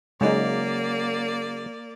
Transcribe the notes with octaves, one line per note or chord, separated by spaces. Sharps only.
C#3 F#3 G#3 A#3 D#4 D5